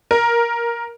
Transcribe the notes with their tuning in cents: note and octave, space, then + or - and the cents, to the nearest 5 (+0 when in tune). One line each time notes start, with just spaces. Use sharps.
A#4 +10